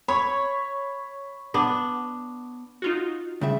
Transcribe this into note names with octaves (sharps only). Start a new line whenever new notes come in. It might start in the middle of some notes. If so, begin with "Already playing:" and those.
C#5 B5
B3 D4
D#4 F4 F#4
C#3 G3 E5